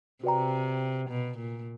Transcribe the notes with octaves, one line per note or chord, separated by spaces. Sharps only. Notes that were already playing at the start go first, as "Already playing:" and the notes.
C3 F#4 B4 D5 G5 A#5
B2
A#2